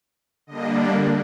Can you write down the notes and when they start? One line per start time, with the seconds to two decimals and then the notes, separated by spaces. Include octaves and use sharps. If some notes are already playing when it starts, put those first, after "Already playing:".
0.47 D3 G3 A#3 D4 D#5